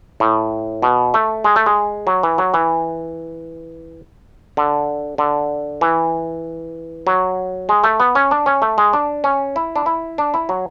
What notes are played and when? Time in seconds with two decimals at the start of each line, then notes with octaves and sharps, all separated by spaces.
0.20 A2
0.82 B2
1.14 A3
1.44 G#3
1.56 A3
1.66 G#3
2.07 F#3
2.23 E3
2.38 F#3
2.54 E3
4.57 D3
5.18 D3
5.81 E3
7.07 F#3
7.69 G#3
7.84 A3
8.00 B3
8.15 C#4
8.31 D4
8.46 C#4
8.62 A3
8.78 G#3
8.93 D4
9.24 C#4
9.56 E4
9.76 D4
9.86 E4
10.18 D4
10.34 E4
10.49 F#3